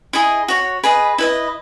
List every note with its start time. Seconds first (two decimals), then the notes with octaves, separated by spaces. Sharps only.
0.13 E4 G#4 D#5
0.48 F#4 C#5
0.83 G#4 B4 D#5 B5
1.18 E4 B4 D#5